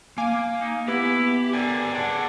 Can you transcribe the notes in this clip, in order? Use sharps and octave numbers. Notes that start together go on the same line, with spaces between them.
A#3 F5 G#5 D6
D#4
B3 E4 G4
D3 A#4 G5 G#5
D4 G#4 F#5 A5